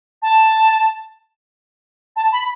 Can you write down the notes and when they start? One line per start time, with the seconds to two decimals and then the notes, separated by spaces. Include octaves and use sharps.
0.22 A5
2.16 A5
2.32 B5